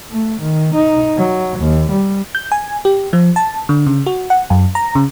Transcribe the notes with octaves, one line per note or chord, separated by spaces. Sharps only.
A3
D#3
D#4
F#3
D#2
G3
G6
G#5
G4
F3
A5
D3
C#3
F#4
F#5
F#2
A#5
C#3